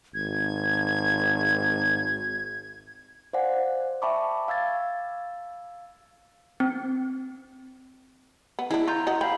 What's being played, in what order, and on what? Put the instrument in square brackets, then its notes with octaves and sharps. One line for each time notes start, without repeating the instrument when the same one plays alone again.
[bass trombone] G#1 [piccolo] G#6
[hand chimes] C5 D5 F5 F#5 G#5
E5 G5 A5 B5 C#6 D6
F5 E6 G#6 A6
[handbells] C4
[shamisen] B3
[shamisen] G#3 D4 [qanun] E4
[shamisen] F4 [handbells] A#5 G6
[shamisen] F#4 D#5
[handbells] F5 B5 [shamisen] G5